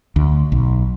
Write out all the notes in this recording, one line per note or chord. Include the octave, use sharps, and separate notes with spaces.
D2
B1